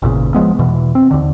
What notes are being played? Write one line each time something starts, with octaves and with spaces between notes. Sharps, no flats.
G#1 E2 A#2 C#3
E1 F3 G#3 B3
E2 B2 E3
C4
D#2 D3